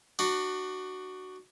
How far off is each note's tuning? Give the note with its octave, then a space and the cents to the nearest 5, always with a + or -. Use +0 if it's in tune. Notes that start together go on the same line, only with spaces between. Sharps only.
D4 +30 F#4 +10